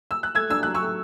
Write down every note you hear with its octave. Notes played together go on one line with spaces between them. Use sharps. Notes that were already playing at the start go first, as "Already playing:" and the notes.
E6
F#6
A3 E6 G#6
D4 E6
F#3 F#6
C#6 E6
A3